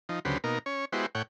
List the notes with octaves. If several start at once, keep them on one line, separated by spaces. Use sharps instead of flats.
F3 D#4
D2 C#3 F#3 G4 B4 C5
B2 A#3 D#4 A#4
C#4 C#5
G#3 B3 E4 F#4 G4 C5
A2 C#5 F#5 G5